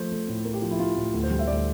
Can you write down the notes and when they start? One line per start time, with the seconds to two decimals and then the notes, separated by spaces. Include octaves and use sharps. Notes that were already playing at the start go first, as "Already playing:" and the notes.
Already playing: F3 A3 C5
0.11 A3
0.28 A2
0.45 A3 A#4
0.54 G4
0.62 F3 F4
0.71 E4
0.79 A3 F4
0.97 A2
1.14 D2
1.23 C5
1.30 G3
1.39 E5
1.47 D2 D5